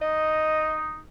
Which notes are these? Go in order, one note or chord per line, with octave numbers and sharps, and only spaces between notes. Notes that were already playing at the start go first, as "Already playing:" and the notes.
D#4 D#5